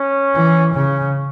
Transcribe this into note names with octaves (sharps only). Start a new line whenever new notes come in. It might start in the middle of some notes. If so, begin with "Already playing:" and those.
Already playing: C#4
E3
C#3 C#4